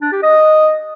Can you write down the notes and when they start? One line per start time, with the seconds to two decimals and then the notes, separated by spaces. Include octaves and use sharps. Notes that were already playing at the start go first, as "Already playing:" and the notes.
0.02 D4
0.12 G4
0.23 D#5